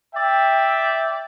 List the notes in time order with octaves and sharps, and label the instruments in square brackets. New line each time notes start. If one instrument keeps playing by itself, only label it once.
[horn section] D5 E5 G5